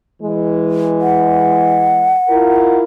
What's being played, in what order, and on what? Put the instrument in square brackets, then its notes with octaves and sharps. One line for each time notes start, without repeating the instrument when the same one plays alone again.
[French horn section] E3 G#3
[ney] F#5
[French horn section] E4 F4 A#4